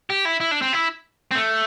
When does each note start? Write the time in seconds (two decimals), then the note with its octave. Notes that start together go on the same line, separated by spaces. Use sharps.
0.10 G4
0.25 E4
0.40 E4
0.51 D4
0.62 C4
0.73 E4
1.31 C4
1.35 A3